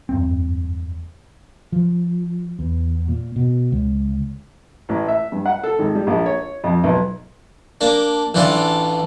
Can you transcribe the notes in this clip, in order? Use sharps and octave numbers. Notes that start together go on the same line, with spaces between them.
F#1 E2 G2 C4
F3
E2
A#2
B2
C#2
A1
E5
G2
F#5
A4
G#1
G3
A#1
C#5
F2
B1
A#3 D4
A1 E3 D4 F4 D5